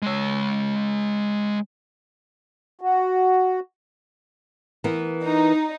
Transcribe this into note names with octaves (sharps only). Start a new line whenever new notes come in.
G#3 C#5
F#4
E3 B3 A#4
D#4